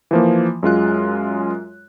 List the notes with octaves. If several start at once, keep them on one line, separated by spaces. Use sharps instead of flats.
E3 F3 A#3
F#2 G#3 F4 F#6